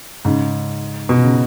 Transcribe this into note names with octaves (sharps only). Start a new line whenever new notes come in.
G#2 C#3
B2
C#3